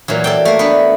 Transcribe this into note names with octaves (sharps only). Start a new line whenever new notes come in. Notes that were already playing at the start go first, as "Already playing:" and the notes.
A#2 E3 F#3
A4 D5 G5
A3 A#3
B3 D4 B4